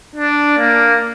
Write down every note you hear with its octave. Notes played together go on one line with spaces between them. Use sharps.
D4
A#3